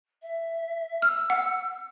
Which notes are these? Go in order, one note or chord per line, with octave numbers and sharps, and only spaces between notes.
E5
E6 F6
F#5